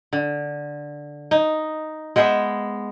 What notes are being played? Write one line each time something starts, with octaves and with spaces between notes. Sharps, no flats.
D3
D#4
G#3 B3 C5 E5